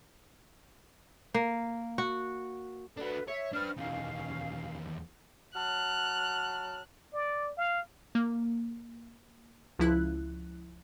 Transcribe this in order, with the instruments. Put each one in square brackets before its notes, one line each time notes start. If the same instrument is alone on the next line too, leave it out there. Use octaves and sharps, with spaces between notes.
[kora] A#3
F#4
[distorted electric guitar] D4 F#4 [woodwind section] A4 B4
[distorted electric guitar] C#5 [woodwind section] E5
[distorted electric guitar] D4 B4 [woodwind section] C5 F6
[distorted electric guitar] E2 D#3 [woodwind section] B2 C#4 F5
[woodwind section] F#3 A5 F6 [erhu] F#6
[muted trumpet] D5
F5
[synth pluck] A#3
C#2 F3 E4 F#6